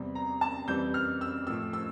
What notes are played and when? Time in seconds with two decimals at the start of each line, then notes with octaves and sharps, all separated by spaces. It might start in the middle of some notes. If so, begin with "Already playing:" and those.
Already playing: E2 C3 G3
0.15 A#5
0.41 A5
0.68 F2 E3 G3 G6
0.94 F6
1.21 E6
1.47 A2 F3 E6
1.73 E6